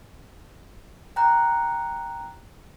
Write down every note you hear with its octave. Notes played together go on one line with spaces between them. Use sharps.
G5 A#5 F#6